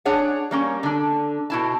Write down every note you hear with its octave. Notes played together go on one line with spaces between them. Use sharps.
D4 G#4 C#5 F#5
G3 A#3 C#4
D3 D4
B2 E4 A5